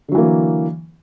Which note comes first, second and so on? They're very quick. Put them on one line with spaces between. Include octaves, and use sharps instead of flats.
D3 F#3 E3 A#3